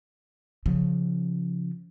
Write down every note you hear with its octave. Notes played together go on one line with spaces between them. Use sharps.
C#3 F3